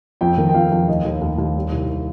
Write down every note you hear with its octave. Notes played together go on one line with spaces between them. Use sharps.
F2 G5
D#3
G5
F2 F5
F2
D#2 D#5
D#2
D#2
D#2
G3
C2